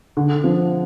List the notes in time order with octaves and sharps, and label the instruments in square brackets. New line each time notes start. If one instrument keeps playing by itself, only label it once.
[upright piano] D3
F3